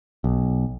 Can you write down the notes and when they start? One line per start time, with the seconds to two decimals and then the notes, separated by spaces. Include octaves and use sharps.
0.24 B1